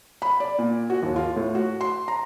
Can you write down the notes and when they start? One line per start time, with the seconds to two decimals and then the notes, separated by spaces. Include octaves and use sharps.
0.22 B5
0.40 D5
0.59 A#2
0.90 F#4
1.03 D#2
1.16 F4
1.36 A2
1.55 F#4
1.81 C6
2.08 A#5